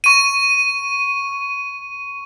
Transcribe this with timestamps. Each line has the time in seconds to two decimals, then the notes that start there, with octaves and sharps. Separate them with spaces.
0.04 C#6 D#7